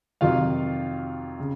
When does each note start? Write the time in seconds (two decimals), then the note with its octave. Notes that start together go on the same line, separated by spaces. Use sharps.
0.21 F2 C3 D#3 F#3 F4 F5
1.40 C#3